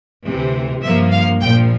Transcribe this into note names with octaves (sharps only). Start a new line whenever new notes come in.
D2 C3 E3
G2 F3 A#3 E5
F5
A#1 A#2 F3 G5